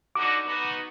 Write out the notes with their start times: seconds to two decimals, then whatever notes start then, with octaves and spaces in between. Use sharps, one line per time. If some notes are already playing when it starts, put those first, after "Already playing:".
0.15 D3 D#4 F#4 D6
0.45 B3 D#4 F#4